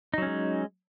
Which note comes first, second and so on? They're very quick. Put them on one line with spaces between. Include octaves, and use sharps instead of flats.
D#4 F#3 C#4 G#3